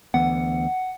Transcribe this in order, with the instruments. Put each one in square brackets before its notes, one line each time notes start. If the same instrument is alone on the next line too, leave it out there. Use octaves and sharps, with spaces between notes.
[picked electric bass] D2 E3 B3 [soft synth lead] F#5